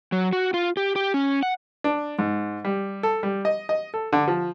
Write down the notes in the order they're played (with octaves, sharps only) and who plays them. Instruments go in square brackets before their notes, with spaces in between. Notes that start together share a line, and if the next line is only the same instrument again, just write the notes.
[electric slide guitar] F#3
F#4
F4
G4
G4
C#4
F#5
[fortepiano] D4
G#2
G3
A4
G3
D#5
D#5
A4
D3
F3